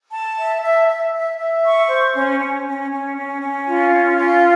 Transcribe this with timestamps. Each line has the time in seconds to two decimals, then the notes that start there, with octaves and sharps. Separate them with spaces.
0.11 A5
0.37 E5
0.62 E5
0.88 E5
1.13 E5
1.37 E5
1.64 C#6
1.88 C5
2.14 C#4
2.39 C#4
2.65 C#4
2.90 C#4
3.16 C#4
3.41 C#4
3.67 F4
3.92 C#4
4.17 F4